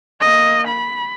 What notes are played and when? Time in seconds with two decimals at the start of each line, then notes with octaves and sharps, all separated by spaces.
0.20 A#3 D#5
0.67 B5